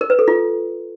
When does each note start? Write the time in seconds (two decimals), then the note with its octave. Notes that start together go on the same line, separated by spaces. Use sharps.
0.01 A#4
0.10 B4
0.19 A4
0.28 F4